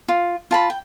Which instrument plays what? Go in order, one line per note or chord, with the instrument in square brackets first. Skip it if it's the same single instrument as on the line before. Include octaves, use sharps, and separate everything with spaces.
[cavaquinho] F4
F4 A5 B5
G5